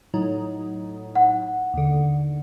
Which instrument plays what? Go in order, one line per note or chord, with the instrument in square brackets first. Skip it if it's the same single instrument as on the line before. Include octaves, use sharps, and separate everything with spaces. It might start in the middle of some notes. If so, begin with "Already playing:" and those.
[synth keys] A2 F#3 D#4
[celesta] F#5
[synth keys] D#2 D3